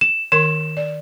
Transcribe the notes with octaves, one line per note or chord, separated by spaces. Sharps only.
E7
D#3 A#4 C6 E7
D5